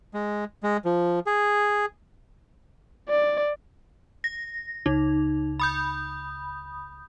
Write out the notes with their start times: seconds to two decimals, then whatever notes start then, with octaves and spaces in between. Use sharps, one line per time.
0.14 G#3
0.63 G#3
0.85 F3
1.26 G#4
3.09 D5
4.24 A#6
4.86 C#2 D#4
5.60 B5 D#6 G6